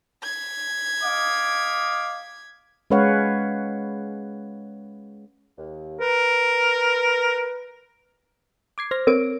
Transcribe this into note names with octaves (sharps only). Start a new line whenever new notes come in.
G#6 B6
D#5 F5 D6
G#3 C#4 B4 C#5 F5 F#5
D#2
A#4 B4
D6 G#6 C7
C5 F6 A#6
C4 A#4 C#5 D7